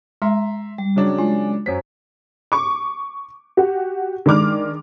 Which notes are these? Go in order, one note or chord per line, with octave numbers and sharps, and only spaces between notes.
G#3 E5 A#5 C6
G3
C#3 F#3 D4
G#3 F4
F#2 F#3 C5 B6
C#6 D6
F#4 G4 F#5
D#3 G#3 D4 D6 F6